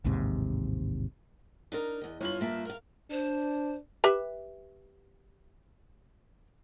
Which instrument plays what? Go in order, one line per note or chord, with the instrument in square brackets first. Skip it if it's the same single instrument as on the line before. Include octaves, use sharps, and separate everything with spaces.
[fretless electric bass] A1 D#2 G#2 C3
[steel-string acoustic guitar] D4 D#4 A#4
E2 D#5
[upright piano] G1 F4 F#7 [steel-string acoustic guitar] C#5
[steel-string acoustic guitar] A#3 E5 A5
A#4 F5
[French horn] D4 [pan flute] C5
[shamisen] G4 B4 E5